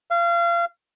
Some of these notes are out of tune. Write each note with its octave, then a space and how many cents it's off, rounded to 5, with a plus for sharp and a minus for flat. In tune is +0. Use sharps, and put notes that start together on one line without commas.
F5 -30